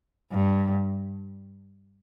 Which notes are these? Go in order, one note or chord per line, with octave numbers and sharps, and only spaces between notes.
G2